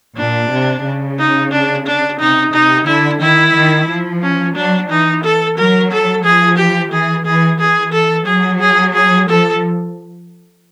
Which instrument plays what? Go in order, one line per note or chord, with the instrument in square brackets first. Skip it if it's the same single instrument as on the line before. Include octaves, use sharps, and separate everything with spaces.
[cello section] A#2 [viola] D4
[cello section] C3
C#3
[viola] D#4
D4
D4
[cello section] C3 [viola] D#4
[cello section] C3 [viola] D#4
[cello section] D3 [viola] E4
[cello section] D#3 [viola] E4
[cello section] D#3
F3
[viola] C#4
[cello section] F#3 [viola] D4
[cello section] E3 [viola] D#4
[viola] A4
[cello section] F#3 [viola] A#4
[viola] A4
[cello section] F3 [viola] G#4
[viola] G4
[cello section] E3 [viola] G#4
[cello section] E3 [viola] G#4
[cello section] E3 [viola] G#4
[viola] A4
[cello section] F#3 [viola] G#4
[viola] G#4
G#4
[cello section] F3 [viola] A4